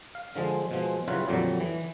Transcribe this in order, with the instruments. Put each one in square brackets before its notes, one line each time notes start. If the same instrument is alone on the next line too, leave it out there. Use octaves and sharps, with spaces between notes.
[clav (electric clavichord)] F5
D3 F3 G#3
B2 F3 G#3
C#3 F#3 G3 E4 F4 B4
F2 A#2 D3 F#3 G3
E3